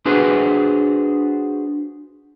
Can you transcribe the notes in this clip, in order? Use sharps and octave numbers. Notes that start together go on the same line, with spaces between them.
D4 F4 F#4 G#4 B4 C5